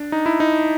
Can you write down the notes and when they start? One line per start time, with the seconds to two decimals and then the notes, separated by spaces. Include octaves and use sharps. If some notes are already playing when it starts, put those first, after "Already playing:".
Already playing: D4
0.12 D#4
0.26 E4
0.40 D#4